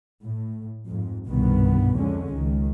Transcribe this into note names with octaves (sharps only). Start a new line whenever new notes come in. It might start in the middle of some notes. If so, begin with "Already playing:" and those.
A2
F2 G#2
G1 C2 G2 B2 D#3 B3
F2 D3 G#3 C#4
C#2 D#3